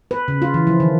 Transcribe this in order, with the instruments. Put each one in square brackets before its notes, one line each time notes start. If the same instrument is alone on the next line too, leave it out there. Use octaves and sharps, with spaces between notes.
[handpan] B4
C#3
F4
E3
F3
D#3